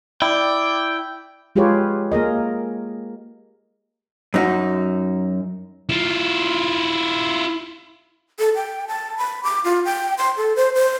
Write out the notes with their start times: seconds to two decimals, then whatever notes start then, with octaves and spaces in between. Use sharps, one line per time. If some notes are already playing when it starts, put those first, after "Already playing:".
0.22 E4 D5 G5
1.56 G#3 F4 G4 G#4 B4 C#5
2.12 A#3 G#4 A#4 D#5
4.34 F#2 D#4 F#4
5.89 E4 F4
8.39 A4
8.55 G5
8.88 A5
9.18 B5
9.44 D6
9.64 F4
9.85 G5
10.18 C6
10.37 A4
10.56 C5
10.75 C5